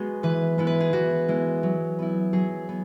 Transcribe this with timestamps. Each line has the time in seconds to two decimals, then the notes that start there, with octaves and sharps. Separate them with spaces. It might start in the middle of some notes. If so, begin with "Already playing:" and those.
Already playing: G#3 B3 F#4 G#4
0.23 E3 B4
0.58 G#3 B3 E4
0.67 B4
0.80 G#4
0.93 E3 F#4
1.28 G#3 B3 E4
1.63 F#3
1.99 B3 E4
2.33 F#3 G#4
2.69 B3